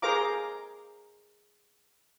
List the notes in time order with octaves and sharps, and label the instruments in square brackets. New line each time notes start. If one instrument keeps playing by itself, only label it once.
[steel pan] G#4 A#4 C5 F5 A#5 D6